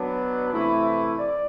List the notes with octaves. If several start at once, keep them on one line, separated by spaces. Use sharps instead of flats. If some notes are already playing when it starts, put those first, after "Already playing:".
Already playing: F#3 B3 D4
C3 E3 A3 E4 B4
D5